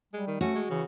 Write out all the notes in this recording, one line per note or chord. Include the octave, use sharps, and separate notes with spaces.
G3 G#3
D#3
A3 C#4 F#4
G#3
C#3 E3